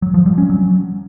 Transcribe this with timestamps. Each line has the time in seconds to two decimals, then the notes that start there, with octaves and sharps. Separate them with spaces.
0.02 F#3
0.14 F3
0.26 G3
0.38 C#4
0.50 F#3